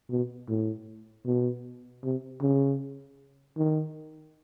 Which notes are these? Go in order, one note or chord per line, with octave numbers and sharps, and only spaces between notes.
B2
A2
B2
C3
C#3
D#3